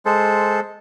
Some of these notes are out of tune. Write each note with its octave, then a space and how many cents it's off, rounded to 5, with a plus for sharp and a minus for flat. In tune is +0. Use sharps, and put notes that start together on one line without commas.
G#3 +5 A4 -5 C5 -5